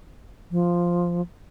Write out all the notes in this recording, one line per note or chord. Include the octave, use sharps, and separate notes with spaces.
F3